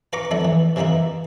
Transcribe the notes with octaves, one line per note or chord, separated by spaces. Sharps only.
B4 F5 A#5 C#6 D6
F2 A3 D4 E4
E3
C3 E3 A#3 D#4 E4